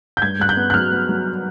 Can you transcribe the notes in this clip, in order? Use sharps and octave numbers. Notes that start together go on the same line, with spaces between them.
G6
G2 G#6
G2 F#6
G6
B3
F#6
F#3 F6
B3
F#3